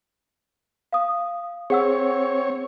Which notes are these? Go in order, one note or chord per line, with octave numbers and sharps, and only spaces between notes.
F5 D#6
C4 G#4 C#5 F#5 E6